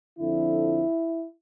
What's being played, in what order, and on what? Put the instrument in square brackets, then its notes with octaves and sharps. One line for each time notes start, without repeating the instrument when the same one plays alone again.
[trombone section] F2 D3 F3 E4